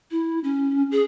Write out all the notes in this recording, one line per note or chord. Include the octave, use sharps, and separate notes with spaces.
E4
C#4
G#4